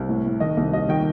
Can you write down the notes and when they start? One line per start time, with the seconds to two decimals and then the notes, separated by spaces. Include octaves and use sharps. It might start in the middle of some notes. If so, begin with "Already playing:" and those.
Already playing: C2
0.09 A2
0.24 A2
0.40 D#3 D#5
0.57 C2
0.73 D#2 D#5
0.89 D#3 G5